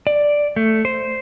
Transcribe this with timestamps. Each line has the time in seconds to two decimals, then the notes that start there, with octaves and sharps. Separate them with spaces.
0.07 D5
0.56 A3
0.85 C5